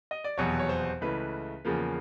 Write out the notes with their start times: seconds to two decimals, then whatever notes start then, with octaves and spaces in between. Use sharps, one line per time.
0.11 D#5
0.24 D5
0.37 F1 E2 B2 F#3 C#5
0.60 C#5
0.69 C5
1.01 C#2 C#3 E3 A3 B4
1.65 E2 C#3 F3 A#3